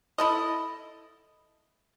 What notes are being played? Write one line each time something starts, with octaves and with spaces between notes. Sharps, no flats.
E4 A4 D#5